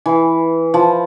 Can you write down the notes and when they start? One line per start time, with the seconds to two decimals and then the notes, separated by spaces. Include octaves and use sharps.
0.06 E3
0.74 F3